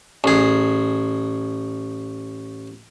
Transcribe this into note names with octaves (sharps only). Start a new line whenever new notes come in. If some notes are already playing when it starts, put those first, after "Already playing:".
A1 G#4